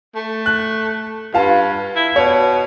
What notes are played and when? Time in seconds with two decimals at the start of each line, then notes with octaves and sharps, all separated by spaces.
0.15 A3
0.46 F#6
1.34 G2 F4 F5 A5
1.96 E4
2.16 B2 C#5